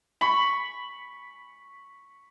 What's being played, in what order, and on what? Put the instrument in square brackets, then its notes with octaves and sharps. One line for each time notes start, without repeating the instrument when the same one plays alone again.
[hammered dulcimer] B5 C#6